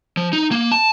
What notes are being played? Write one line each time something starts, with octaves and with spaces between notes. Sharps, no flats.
F3
D#4
A#3
A5